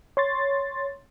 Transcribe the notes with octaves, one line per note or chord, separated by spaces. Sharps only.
C#5 C6 A6